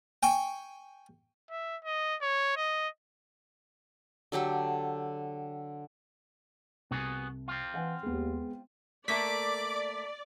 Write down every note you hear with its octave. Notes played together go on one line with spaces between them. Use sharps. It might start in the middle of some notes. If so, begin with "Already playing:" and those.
G5 G#5 C#6
E5
D#5
C#5
D#5
D3 F#3 G4 A4
C2 B3 F#4 G#4
C4 F4
E3 F5 F#5 G#5
D#2 G#3 B3
A3 A#3 D5 D6 B6